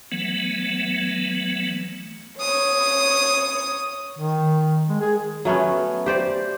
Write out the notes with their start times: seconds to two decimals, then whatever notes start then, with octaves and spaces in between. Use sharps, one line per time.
0.12 E3 F#3 A3 B3
2.39 C#5 D#6
4.19 D#3
4.89 G#3
5.01 G#4
5.45 F#3 A3 B3 C#4
6.06 G4 C5 D5